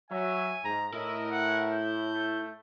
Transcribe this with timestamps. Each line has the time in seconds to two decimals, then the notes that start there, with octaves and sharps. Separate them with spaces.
0.11 F#3 E5 G#5
0.65 G#2 A#5
0.93 A2 E4 A#4 D#5 E5
1.31 F#5
1.72 G6
2.14 A3